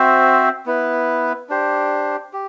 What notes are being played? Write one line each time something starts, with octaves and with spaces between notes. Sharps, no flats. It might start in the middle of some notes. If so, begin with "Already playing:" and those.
Already playing: C4 F#4 C5 E5
B3 E4 B4
D4 G4 C5
G4